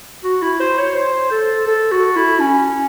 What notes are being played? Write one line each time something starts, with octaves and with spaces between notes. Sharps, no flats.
F#4
E4
C5
C#5
C5
A4
A4
F#4
E4
C#4